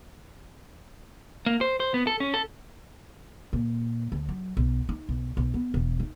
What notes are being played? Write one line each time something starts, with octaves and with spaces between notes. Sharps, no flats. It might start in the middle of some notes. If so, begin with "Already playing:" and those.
A#3
C5
C5
B3
A4
C#4
A4
A#2
D2
F#3
B1
D#4
B1
B1
B3
E1
D#4